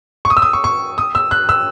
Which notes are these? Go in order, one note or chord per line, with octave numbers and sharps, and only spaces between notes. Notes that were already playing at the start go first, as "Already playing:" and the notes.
C#6
D#6
E6
D#6
C#6
C#6
D#6
E6
F#6
E6